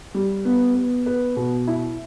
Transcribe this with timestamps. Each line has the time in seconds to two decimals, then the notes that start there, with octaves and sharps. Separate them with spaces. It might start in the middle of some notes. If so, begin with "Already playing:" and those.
0.14 G3
0.45 B3
0.75 B3
1.06 B4
1.37 B2
1.67 E4